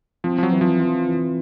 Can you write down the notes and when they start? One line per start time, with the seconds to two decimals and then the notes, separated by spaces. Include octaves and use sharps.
0.24 F3 C4
0.38 F3
0.43 F#3
0.52 E3
0.61 F3
0.80 F4
1.08 E3